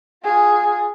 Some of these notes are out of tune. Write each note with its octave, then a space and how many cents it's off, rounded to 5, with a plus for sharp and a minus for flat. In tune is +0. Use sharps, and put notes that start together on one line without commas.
F4 +25 G#4 +0